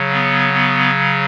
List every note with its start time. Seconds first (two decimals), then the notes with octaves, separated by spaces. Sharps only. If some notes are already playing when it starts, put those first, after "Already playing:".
Already playing: C#3 F#3
0.12 B3
0.53 B3